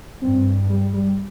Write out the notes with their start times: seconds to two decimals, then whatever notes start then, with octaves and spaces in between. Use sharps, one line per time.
0.22 G2 C4
0.69 G3
0.93 G3